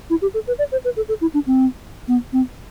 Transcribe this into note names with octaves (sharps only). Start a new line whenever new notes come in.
E4
G4
A4
B4
D5
C5
B4
A4
A4
E4
D4
C4
B3
C4